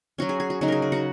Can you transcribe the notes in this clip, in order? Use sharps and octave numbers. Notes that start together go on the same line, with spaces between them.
F#3 C#4 F#4
G#4
G#4
F#4
C#3 F#3 D#4 F#4
G#4 A#4
G#4
F#4 F#5